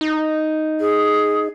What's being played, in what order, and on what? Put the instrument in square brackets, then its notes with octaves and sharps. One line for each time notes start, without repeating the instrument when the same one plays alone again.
[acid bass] D#4
[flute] G#4